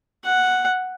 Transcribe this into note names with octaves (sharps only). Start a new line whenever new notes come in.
F#5